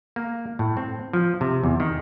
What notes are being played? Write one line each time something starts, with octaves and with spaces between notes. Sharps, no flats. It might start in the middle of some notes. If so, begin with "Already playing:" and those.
A#3
A2
C4
F3
C3
E2
D#3